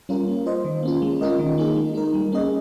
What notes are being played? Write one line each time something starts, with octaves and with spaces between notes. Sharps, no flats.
G3 C#4 F4 A#4
A#3
F4 C5 D#5
D#3
A#3 C#4 F4
G#3
C#4 F4 A#4 D#5
D#3
A#3 D#4 G#4
G#3
D#4 A#4
G3
A#3 C#4 G#4 D#5